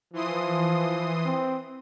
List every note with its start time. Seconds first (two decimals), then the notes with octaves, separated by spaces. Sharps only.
0.13 E3 F3 C6 D#6
1.25 C4